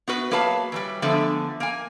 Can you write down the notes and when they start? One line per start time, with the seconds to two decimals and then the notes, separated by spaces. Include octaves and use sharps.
0.08 B3 F#4 B4
0.31 F#3 A#3 G#4 B4 F5 A5
0.72 E3 F#3 G3
1.02 D3 F3 G#3 A3 B3
1.60 A#3 G#5